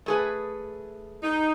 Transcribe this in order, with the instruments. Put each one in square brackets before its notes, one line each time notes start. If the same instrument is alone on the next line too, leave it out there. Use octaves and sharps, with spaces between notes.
[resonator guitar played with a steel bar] A3 G#4 B4
[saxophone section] D#4